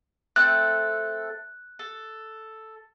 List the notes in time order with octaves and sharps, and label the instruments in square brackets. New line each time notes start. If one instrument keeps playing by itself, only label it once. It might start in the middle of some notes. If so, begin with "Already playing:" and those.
[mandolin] A3 C4 A4 [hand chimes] F#6
[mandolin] A4